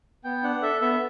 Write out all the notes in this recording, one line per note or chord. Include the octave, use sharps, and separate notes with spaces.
B3 G5
D4 F#5
A4 E5
B3 E5